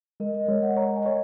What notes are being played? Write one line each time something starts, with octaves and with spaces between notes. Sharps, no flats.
G#3 A#4 D#5
A#4 D#5
G#3 C#5
C#5 F#5
C#5 F#5 A#5
D#5 G#5
C#5